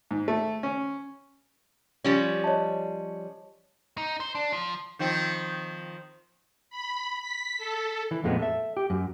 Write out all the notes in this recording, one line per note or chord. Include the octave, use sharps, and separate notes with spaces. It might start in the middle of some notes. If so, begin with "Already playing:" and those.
G#2
A3
C#4
F3 G3 C#4
C#5 D#5 A5
D#4
C5
D4
F3
D#3 F3 C4
B5
B6
A4
E3
F2 A#2 G#3 A3 B3 C4
A4 E5
G4
F#2